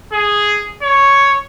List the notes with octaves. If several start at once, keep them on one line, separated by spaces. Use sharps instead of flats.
G#4
C#5